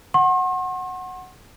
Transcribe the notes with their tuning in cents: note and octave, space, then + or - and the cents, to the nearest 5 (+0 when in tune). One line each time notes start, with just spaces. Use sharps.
F#5 +0 C6 +45